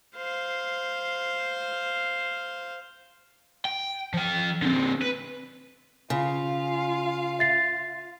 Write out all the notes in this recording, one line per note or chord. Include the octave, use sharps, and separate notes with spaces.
C5 F5
G5
F3 G5
D3 C4
B4
C#3 F4 F5
E5 A6 C7